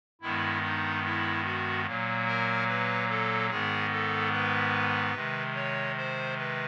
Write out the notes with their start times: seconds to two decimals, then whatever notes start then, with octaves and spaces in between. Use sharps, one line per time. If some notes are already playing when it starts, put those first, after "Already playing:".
0.21 G2 D#3 G#3 B3 E4
0.63 D#4
1.05 E4
1.45 F#4
1.86 A#2 F#3 A#3
2.27 A#4
2.68 B4
3.09 A4
3.50 G#2 D#3 G#3 B3 G#4
3.91 A4
4.32 B4
5.14 C3 D#3 G#3
5.55 C#5
5.97 C5
6.38 B4